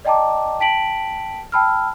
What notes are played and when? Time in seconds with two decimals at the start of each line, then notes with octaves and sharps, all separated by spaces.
0.05 D5 D#5 G5 A5 A#5 D6
0.60 G5 A5 B6 D7 F#7
1.52 G5 A5 B5 E6 F6